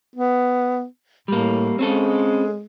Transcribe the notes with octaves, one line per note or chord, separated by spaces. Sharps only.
B3
A2 G3 A#3
G#3 C4 C#4 A4